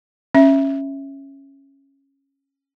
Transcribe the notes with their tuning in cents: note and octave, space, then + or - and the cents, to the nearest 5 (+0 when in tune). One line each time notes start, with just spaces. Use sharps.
C#4 -10 E5 +0